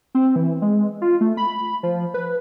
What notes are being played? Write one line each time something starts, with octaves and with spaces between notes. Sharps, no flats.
C4
E3
G#3
F4
A3
B5
F3
B4